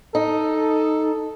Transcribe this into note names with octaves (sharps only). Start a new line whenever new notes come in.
D#4 A4